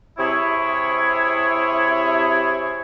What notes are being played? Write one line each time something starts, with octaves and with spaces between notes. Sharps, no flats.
C3 E4 G#4 C#5